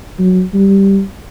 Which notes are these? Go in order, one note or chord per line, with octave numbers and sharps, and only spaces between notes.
F#3
G3